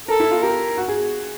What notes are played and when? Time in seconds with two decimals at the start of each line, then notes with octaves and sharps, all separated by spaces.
0.08 A4 A#4
0.20 E4
0.31 F4
0.43 G4 A#4
0.77 F#4
0.88 G#4